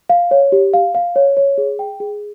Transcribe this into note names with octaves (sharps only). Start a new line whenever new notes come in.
F5
C#5
G4
F5
F5
C#5
C#5
G#4
G5
G#4